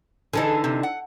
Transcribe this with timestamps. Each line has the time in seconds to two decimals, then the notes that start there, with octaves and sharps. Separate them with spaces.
0.33 D3 E3 D#4 G#4 A4
0.64 C3
0.83 F#5